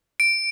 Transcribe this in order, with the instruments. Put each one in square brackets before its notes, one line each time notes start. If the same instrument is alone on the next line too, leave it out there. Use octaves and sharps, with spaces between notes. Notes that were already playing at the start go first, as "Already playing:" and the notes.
[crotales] D7